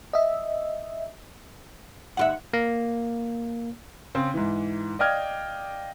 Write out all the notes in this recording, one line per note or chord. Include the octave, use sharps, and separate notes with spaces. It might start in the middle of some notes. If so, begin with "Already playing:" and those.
D#5 E5
D#2 F4 E5 F#5
A#3
C#3 C4
G#2 E3
D5 D#5 F5 G5 F6 G#6